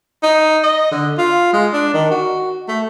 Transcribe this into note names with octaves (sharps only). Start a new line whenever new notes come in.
D#4
D#5
D3
F4
G#3
D4
D#3
F#4
A3